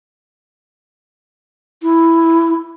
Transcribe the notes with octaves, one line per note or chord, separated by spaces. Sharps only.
E4